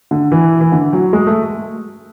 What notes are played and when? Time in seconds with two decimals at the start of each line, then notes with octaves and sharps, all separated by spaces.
0.11 D3
0.32 E3
0.61 E3
0.72 D3
0.93 F#3
1.13 G#3
1.27 A3